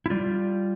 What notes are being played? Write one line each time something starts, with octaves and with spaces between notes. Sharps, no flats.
E4
G3 F4